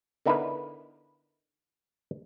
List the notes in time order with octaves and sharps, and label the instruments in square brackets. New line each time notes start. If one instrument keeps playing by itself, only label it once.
[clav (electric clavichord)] D3 B3 D#4 E4 A#4 B4